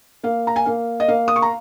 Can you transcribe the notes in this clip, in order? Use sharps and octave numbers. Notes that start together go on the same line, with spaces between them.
A#3 F5
A#5
G#5
A#3 F5
D#5
A#3 F5
D#6
C#6
A#5